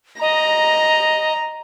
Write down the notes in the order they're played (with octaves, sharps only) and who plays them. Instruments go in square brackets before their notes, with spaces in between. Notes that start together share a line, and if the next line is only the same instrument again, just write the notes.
[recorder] D#5 [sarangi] A#5